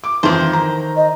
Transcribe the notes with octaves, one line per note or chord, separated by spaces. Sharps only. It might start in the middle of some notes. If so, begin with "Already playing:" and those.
D6
F2 D#3 E3 C5
A#5
D#5